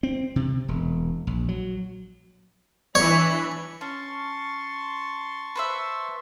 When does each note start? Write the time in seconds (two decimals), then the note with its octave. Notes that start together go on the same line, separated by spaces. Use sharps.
0.03 C4
0.36 C3
0.68 E1
1.27 A#1
1.49 F#3
2.95 E3 D4 C#5 B5
3.81 C#4 A5 C6 C#6
5.56 B4 C5 E5